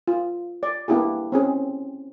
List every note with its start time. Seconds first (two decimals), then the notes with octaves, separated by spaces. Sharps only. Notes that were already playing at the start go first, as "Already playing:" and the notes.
0.08 F4
0.63 D5
0.88 A#3 B3 D4 E4 G4 G#4
1.32 C4 C#4 G#4